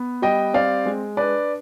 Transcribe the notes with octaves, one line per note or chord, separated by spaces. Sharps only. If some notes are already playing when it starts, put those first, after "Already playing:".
Already playing: B3
G3 D#5 G5
C4 D5 F5
G#3
D4 B4 D5